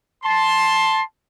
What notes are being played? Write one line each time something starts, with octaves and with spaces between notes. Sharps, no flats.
A5 C6